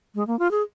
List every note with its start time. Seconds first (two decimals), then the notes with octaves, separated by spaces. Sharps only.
0.15 G#3
0.27 A#3
0.39 F4
0.51 G#4